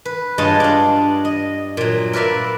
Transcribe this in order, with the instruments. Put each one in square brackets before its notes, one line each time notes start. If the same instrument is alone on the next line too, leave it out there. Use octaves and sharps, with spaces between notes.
[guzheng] B4
G2 G#3 F4 C#5 D#5 A5
D4 F5
D#5
A#2 F#3
A#4 B4 D5 E5 F5